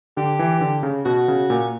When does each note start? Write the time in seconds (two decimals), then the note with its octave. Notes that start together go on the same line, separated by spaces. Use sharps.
0.17 D3 G4
0.39 E3
0.61 D3
0.83 C#3
1.05 B2 F#4
1.28 C#3
1.50 A#2